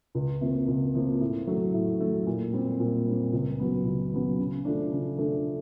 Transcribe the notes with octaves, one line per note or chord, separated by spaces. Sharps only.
C#2
C3 F3 A#3
C#2
C3 F3 A#3
A2
F#3 A3
A2
F#3 A3
A#2
G3 C4
A#2
G3 C4
C#2
C#3 F#3 B3
C#2
C#3 F#3 B3
C#3
F3 A3 D4
C#3
F3 A3 D4